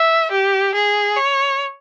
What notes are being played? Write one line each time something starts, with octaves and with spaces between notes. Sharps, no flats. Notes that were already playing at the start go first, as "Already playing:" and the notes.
Already playing: E5
G4
G#4
C#5